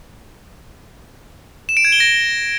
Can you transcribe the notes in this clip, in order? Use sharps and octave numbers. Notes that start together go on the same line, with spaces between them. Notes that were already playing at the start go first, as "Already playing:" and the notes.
E7
D7
G#6
G7
A#6